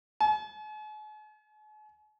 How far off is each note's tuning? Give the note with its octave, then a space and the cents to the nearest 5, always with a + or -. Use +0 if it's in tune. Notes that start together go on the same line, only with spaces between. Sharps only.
G#5 +45